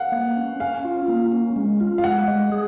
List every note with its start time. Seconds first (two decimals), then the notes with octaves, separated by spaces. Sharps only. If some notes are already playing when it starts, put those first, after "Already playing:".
Already playing: F5 F#5
0.12 A#3
0.37 C#4
0.60 C#4 F5
0.85 F4
1.08 A#3
1.32 C#4
1.56 G#3
1.80 F4
1.98 F5
2.04 G#3 F#5
2.28 G#3
2.52 G#4